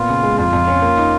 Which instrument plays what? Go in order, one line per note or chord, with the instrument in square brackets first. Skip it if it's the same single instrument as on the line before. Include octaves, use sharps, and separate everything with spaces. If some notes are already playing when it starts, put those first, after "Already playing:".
Already playing: [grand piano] A#2 B3 [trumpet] F4
[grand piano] C#3
G#3
[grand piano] F2 [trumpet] F4
[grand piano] F2
C#4
A#3
D#4